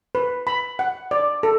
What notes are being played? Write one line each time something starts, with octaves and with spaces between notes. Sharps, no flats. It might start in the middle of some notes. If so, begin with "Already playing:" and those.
B4
B5
F#5
D5
A4